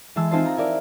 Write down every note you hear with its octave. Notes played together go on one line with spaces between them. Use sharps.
E3 G#3 A5 E6
C4 D#4 F4 G#4 C5 A5
A#5
E4 A#4 D5